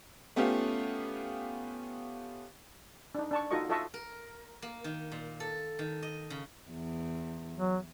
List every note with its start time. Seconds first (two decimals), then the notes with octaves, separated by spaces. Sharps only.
0.36 A3 B3 C#4 F4 G4 F5
3.15 D4 D#4
3.31 D4 A5 C#6
3.51 D#4 F4 F#4 A4 D#5 C#6
3.69 F4 A4 D#5 E5 A5 C#6
3.94 A#4
4.62 A#3
4.84 D#3
5.12 A#2
5.40 A4
5.79 D#3
6.02 D#5
6.30 C#3
6.71 E2
7.56 F#3